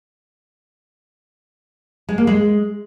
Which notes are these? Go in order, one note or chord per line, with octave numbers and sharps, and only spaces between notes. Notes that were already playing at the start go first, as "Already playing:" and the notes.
G#3
A#3
G#3